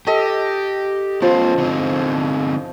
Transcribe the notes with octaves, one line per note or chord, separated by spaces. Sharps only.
G4 A4 D#5
F3 B3 C#4 C5
D3 C4 D#4